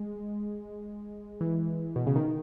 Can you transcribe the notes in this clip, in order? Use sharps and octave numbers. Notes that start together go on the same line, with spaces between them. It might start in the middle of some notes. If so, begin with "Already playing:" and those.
Already playing: G#3
E3
B2
C#3
D#3